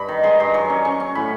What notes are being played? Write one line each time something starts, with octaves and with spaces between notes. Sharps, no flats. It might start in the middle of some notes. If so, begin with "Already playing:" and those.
Already playing: G2 B5
D#3
G#3 C6
G2
F#3 C#6
C#4
C#4 C#6
C#4
A2 B5